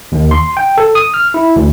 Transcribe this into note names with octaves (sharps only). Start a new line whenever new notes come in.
D#2
C6
G5
A4
D#6
F6
E4
D2